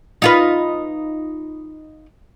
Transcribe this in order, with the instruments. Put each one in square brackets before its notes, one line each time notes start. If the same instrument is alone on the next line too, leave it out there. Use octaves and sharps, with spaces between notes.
[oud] D#4 F4 B4